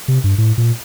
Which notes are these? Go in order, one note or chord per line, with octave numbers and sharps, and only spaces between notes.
C3
G2
A2
A#2